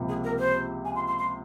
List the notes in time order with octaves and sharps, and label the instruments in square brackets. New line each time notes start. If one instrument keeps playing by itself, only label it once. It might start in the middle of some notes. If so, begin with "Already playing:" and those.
Already playing: [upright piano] C#2 C3 F3 A#3
[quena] G#4
A#4
C5
G#5
C6
C6
C6